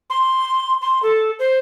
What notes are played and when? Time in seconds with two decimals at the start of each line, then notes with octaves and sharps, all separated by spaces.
0.10 C6
0.82 C6
1.03 A4
1.39 C5